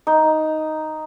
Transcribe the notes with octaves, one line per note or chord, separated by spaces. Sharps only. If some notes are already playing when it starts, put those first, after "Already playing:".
D#4